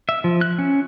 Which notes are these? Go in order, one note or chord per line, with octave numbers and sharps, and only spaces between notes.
E5
F3
F#6
C#4